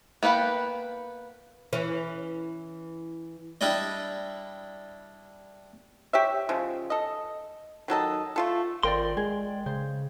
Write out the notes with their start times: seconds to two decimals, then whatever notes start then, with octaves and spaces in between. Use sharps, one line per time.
0.23 A#3 B3 B4 F#5 G5
1.73 E3 C#4
3.61 G3 D4 E4 D5 D#5
6.13 G4 C#5 E5
6.49 C#3 F3 G#3
6.90 A4 D#5
7.88 D#3 F#3 A4 D#5
8.36 A3 F4 A4
8.83 G#1 F4 A#4 C5 D5 G5 C6
9.17 G#3 G#4
9.66 C#3 C5